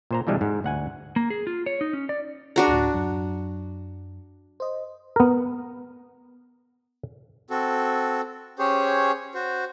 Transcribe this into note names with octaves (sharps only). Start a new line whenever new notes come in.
A#2 C5 A#5
B2 E3 G3 G#3 D4
G#2
D2 F#5 G#5
A#3
G#4
F4
C#5
D#4
C#4
D5
D4 F#4 G#4 A#5
D2 A2
F#2 F#3
C5 D#5
B3 A#4
C4 F#4 A4
C#4 G4 G#4 C5 C#5
F#4 C5